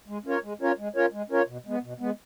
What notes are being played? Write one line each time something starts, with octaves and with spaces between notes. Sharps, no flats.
G#3
C#4 F4 A#4 C#5
G#3
C#4 F4 A#4 C#5
G#3
C#4 F4 A#4 C#5
G#3
C#4 F4 A#4 C#5
B2
G#3 B3
B2
G#3 B3